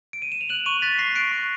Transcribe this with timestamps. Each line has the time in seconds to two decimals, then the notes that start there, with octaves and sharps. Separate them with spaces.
0.13 D7
0.22 D#7
0.32 E7
0.41 F7
0.49 F#6 E7 F#7
0.66 C#6 D#7 F7
0.82 F#6 A6 B6
0.99 C#6 A#6 C7
1.15 F#6 C7 D7
1.32 C#6